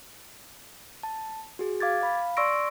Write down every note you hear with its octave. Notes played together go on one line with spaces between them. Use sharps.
A5
F#4 G#4
F5 D6 G#6 A6
F5 B5
D5 C6 C#6 E6 A#6 D7